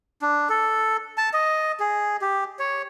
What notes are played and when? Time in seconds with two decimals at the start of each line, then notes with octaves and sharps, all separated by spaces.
0.22 D4
0.49 A4
1.18 A5
1.33 D#5
1.80 G#4
2.22 G4
2.59 C#5